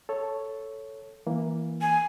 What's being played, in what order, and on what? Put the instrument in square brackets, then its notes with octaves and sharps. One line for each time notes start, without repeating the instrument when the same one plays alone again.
[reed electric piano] A4 C#5
E3 A#3
[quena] G#5